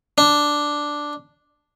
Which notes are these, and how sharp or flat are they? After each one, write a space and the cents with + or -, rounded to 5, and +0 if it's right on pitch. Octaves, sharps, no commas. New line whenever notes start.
D4 +0